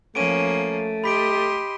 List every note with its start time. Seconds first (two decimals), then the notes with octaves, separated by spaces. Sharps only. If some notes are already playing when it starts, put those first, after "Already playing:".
0.15 F3 A3 A#3 C#4 D7 D#7
1.04 G4 D#5 B5 C6 B6 D7